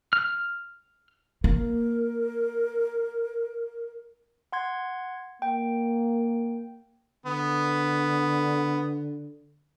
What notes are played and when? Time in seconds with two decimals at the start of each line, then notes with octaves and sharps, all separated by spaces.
0.13 F6
1.44 A#3 A#4
4.52 F#5 C6 G#6
5.42 A#3 G5
7.26 D3 B3